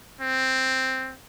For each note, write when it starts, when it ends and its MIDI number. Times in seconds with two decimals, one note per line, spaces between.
0.21 1.14 60